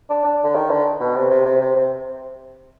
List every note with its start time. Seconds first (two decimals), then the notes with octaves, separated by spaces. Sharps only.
0.10 D4
0.24 D4
0.44 D3
0.55 D#3
0.70 D3
1.00 B2
1.16 C3
1.30 C3
1.45 C3
1.61 C3
1.76 C3